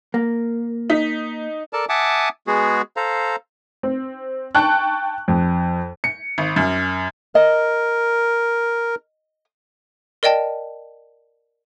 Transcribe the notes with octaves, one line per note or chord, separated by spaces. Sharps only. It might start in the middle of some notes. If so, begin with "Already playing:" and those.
A#3
D#4 B6
A4 A#4 D5 A5
E5 F#5 G#5 A5 D6 D#6
G#3 B3 F#4 G#4
A4 C5 F5 A#5
C4
G5 A5 C#6 F#6
F2
C#7
G#1
F#2
A#4 D#5
A#4 D5 D#5 G5 A5